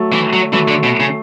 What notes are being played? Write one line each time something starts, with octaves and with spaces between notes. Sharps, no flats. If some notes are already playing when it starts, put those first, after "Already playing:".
Already playing: F#3 A3
E3
F#3
E3 F#3 A3
D3
B2
C#3